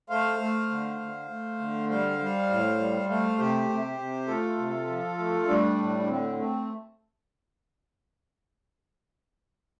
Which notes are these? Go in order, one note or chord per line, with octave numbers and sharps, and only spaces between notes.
A3 C5 F5
A3
D3
D3
A3
D3
G3 C5 F5
G3
A2
G3
A3 C5 F5
C3 G4 C5
C3
C3
A3 F4 A4
C3
F3
A3
G3 A3 D4
A2
D4
D3 C4
A3 C4